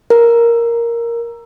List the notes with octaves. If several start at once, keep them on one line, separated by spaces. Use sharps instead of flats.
A#4